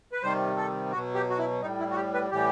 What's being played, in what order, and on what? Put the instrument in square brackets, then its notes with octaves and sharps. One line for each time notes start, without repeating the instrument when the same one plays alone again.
[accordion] B4
C3 D#3 G3 C5
A4
B2 F#3 F#4
G4
F#4
E4
A2 G3 D#4
E4
F#4
G4
B4
A2 E3 G3 G4